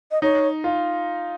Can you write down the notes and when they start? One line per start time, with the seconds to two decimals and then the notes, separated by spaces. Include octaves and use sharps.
0.11 D#5
0.22 D#4 C#5
0.64 F4